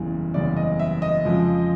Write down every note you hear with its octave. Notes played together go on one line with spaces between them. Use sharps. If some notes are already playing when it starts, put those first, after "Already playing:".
Already playing: F#1 E2 C#3 E3 G3
F#1 E2 C#3 E3 G3 D5
D#5
E5
D#5
F2 C#3 F3 G#3